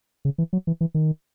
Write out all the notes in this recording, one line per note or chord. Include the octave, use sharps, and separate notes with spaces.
C#3
E3
F#3
E3
E3
D#3